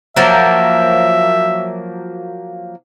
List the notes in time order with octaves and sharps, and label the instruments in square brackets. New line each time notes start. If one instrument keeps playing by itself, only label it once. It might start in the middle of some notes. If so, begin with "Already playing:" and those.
[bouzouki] F3 F#3 A#3 [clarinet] E5